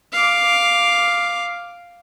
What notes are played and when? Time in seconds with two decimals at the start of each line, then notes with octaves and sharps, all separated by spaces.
0.13 F5 D6